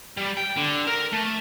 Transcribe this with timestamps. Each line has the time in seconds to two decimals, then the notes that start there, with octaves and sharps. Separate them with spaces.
0.17 G3
0.37 G5
0.57 D3
0.87 A#4
1.13 A3